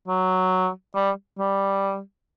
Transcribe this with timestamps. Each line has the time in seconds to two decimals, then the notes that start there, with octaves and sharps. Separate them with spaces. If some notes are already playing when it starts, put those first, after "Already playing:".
0.08 F#3
0.95 G3
1.39 G3